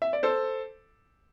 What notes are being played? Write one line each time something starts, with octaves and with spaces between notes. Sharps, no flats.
E5
D5
A4 C5